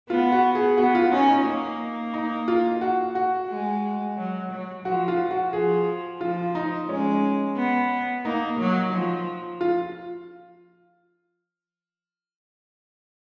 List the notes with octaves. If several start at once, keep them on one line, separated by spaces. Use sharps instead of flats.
B3 F4
F#4
G#4
B3 F#4
F4
C#4 D#4
D#4
A#3
D#4
F4
F#4
F#4
G#3
F#3
F#3
F3 F#4
F4
F#4
F3 G#4
F3 F4
D#4
G#3 C#4
B3
A#3 D#4
F#3
F3
F4